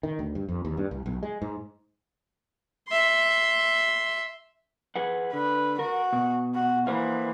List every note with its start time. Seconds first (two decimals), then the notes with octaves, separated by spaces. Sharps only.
0.03 D#3
0.19 D2
0.35 G2
0.49 F2
0.65 D#2
0.77 G2
0.91 C2
1.06 B1
1.23 G#3
1.42 G#2
2.88 E5 C6
4.96 G#4 B4 F#5
5.33 D3 B4
5.79 F#4 A#4
6.13 B2
6.54 F#4
6.87 E3 A#3 C5 F5